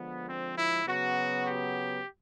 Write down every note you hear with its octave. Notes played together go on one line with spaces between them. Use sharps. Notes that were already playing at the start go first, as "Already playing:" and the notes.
Already playing: D3 F3 G#3 B3
C4
E4
C#3 F#3 B3 F#4
G4